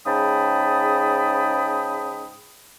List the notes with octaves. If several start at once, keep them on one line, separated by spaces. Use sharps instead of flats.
G#2 C#3 G5 A5 B5 D#6